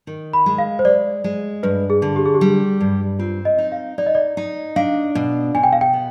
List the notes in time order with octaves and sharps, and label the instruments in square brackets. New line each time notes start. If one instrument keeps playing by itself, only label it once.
[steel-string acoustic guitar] D#3
[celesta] B5
[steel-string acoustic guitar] G#3
[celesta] F5
C5
[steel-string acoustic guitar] G#3 [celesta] D5
[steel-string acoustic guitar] G#3
[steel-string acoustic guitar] G2 [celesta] B4
[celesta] G#4
[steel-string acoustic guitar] D3
[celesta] G4
G#4
G4
[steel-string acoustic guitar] G3
G2
[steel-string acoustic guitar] C4 [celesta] F4
[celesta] D#5
[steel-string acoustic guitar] D#4
[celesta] F5
[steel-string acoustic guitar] D#4 [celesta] D5
[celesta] D#5
D5
[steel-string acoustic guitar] D#4
[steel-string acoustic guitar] D4 [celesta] F5
[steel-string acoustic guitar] B2
[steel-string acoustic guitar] B2 [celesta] G#5
[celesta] G5
F5
G5
[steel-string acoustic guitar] B3